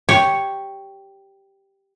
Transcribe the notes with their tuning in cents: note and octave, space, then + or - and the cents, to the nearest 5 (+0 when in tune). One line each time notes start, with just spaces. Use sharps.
G4 +0 C#5 +0